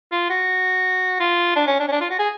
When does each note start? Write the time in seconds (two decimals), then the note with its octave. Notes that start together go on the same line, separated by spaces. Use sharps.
0.12 F4
0.30 F#4
1.20 F4
1.56 D4
1.67 C#4
1.80 D4
1.88 C#4
1.92 D4
2.01 F4
2.10 F#4
2.19 G#4